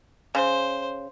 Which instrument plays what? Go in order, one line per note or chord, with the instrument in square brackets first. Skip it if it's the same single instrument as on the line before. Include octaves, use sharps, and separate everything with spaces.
[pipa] C#3 [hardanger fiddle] C5